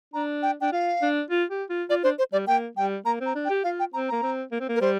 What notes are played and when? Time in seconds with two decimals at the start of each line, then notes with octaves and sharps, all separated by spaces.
0.13 D4 A#5
0.43 G5
0.61 D4 G5
0.72 F4 F5
1.02 D4
1.31 F4
1.50 G4
1.70 F4
1.89 F4 D5
2.03 D4 C5
2.19 C5
2.32 G3 D5
2.47 A#3 G5
2.77 G3 G5
3.05 A#3 A#5
3.21 C4
3.26 A#5
3.35 D4
3.45 G5
3.50 G4
3.64 F4 F5
3.80 G5
3.93 C4 A#5
4.09 A#3 A#5
4.22 C4
4.52 A#3
4.60 C4
4.69 A#3
4.76 A#4
4.81 G3 C5